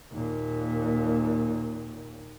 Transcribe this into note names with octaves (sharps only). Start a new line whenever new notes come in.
D#2 A#2